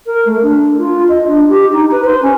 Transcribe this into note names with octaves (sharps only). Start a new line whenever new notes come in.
A#4
A3
D4
F4
D#5
D4
G4
D#4
B4
C5
C#4